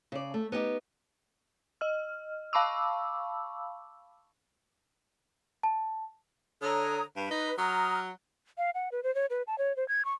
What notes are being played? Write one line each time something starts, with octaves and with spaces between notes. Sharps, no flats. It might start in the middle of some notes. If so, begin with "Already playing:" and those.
C#3 D5
A3
B3 D#4 G4
D#5 F6
F5 A5 B5 C#6 D6 E6
A5
D3 C#5 A#5 D#6
G2 B4
D#4
F#3 A#5 D#6 F6
F5
F#5
B4
C5
C#5
B4
A5
C#5
C5
G#6
C#6